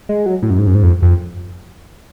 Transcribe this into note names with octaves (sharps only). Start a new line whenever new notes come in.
G#3
F#3
A2
F#2
G#2
F#2
G#2
F2
F2